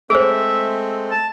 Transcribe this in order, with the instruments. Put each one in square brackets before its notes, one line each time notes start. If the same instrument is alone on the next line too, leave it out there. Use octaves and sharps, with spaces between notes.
[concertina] G#3 A3 C4 [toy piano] G#4 C5 [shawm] E5
[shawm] A5